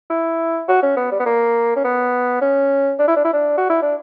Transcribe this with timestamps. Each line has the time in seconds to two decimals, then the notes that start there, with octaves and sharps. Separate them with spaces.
0.10 E4
0.68 F#4
0.83 C#4
0.97 B3
1.12 G3
1.20 B3
1.26 A#3
1.76 C#4
1.84 B3
2.41 C#4
2.99 D4
3.08 E4
3.16 D4
3.25 E4
3.33 D4
3.58 F#4
3.70 E4
3.82 D4